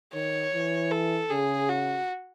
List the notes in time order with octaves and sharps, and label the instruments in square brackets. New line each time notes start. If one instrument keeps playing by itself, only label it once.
[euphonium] D#3 [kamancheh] C#5
[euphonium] E3
[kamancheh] A4
[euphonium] C#3 [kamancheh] G#4
[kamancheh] F#4